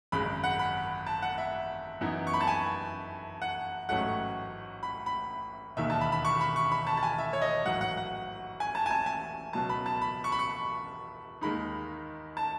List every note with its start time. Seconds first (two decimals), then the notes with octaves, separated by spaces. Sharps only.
0.12 G#1 F#2 C#3 G#3 B5
0.44 F#5
0.59 B5
1.07 A5
1.22 F#5
1.38 E5
2.01 F#2 E3 B3 D#4
2.27 C#6
2.34 B5
2.41 A5
2.47 G#5
3.42 F#5
3.89 A1 G#2 F#3 A3 C#4 F#5
4.83 B5
5.06 B5
5.77 E1 D#2 D#3 E5
5.90 A5
6.01 B5
6.12 B5
6.25 C#6
6.41 B5
6.56 C#6
6.72 B5
6.87 A5
6.97 A5
7.03 G#5
7.18 E5
7.33 C#5
7.42 D#5
7.65 A1 G#2 F#3 F#5
7.81 F#5
7.97 F#5
8.60 G#5
8.75 A5
8.86 G#5
8.91 A5
9.06 G#5
9.53 C#2 B2 F#3 A5
9.69 B5
9.86 A5
10.02 B5
10.24 C#6
10.32 B5
10.39 C#6
11.41 D#2 D#3 G#3 D#4 B5
12.37 A5